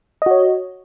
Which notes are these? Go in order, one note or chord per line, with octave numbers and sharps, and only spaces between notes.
F#4 C#5 D#5